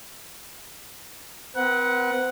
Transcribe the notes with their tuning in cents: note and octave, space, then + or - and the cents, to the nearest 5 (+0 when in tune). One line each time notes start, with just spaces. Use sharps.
C4 -35 B4 -45 F#5 +0